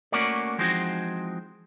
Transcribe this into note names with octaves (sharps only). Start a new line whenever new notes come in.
A3 A#3 C#4 F#4 A#4 D5
E3 F3 G#3 C4 D#4 F#4